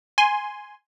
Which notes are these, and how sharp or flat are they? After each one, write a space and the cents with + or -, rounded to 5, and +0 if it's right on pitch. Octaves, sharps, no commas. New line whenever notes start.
G#5 +0 C6 +0